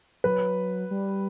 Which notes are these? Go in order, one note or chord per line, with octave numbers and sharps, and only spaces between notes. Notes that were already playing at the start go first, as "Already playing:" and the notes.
F#3 B4
G3